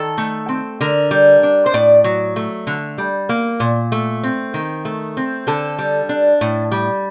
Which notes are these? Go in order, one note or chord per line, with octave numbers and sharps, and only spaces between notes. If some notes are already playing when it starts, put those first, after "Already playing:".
Already playing: D#3 A4
A3
C4
D3 A#4
G3
D4
C5
A2 D5
F#3
A3
D3
G3
A#3
A#2
A3
C4
D#3
A3
C4
D3 A4
G3
D4
A2
G3